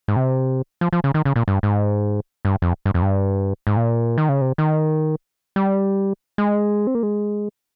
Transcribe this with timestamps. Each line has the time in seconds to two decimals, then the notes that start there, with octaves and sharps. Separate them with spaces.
0.08 G#2
0.16 C3
0.81 F3
0.93 F3
1.04 C#3
1.14 D#3
1.25 C#3
1.36 A#2
1.48 G2
1.63 G#2
2.45 G2
2.62 F2
2.86 G2
2.94 F2
3.02 G2
3.67 G#2
3.77 A#2
4.18 D#3
4.29 C#3
4.41 C3
4.58 D#3
5.56 G3
6.38 G#3
6.87 C4
6.95 A#3
7.03 G#3